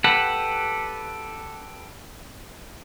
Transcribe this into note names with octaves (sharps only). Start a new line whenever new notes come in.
G4 A4 B4 F#5